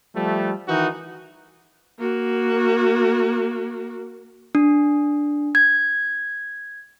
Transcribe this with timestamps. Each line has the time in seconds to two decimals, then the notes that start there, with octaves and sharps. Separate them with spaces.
0.14 F3 G3 A3
0.68 D#3 E3 D#4 F#4
1.99 A#3 F#4
4.55 D4
5.55 G#6